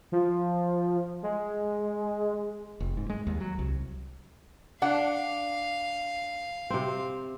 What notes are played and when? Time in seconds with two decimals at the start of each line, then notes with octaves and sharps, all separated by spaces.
0.12 F3
1.23 G#3
2.80 F1
2.97 G#2
3.10 G#3
3.27 D#2
3.40 F#3
3.59 C2
4.82 D4 F5 F#5
6.70 C3 C4